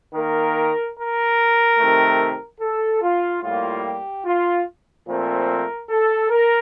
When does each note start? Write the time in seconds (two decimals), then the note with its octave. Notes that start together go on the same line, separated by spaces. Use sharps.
0.14 D#3 A#3 A#4
0.97 A#4
1.78 C3 D#3 A3
2.61 A4
3.02 F4
3.43 A2 G3 A#3 F4
3.84 G4
4.25 F4
5.07 A#2 F3 A3 C4 A#4
5.90 A4
6.30 A#4